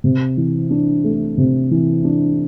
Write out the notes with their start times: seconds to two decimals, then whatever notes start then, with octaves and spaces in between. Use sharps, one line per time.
0.04 C3
0.37 E3
0.71 D4
1.04 A3
1.38 C3
1.71 E3
2.05 D4